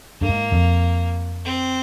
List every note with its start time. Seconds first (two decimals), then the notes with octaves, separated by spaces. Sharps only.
0.21 G2 A#3
0.29 G#2
0.52 F2
1.44 C4